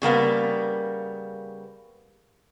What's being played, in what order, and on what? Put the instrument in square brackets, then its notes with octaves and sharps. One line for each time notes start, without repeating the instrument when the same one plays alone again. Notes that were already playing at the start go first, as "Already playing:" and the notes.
[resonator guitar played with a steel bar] C#3 G3 A#3 B3